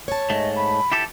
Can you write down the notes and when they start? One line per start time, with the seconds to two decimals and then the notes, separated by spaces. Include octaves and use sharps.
0.08 C#5 A5
0.30 G#2 A3 D#5
0.56 B5
0.92 E4 G4 A4